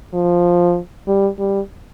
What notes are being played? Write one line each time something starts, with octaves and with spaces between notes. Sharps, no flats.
F3
G3
G3